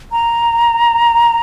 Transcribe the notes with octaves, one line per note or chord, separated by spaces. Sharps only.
A#5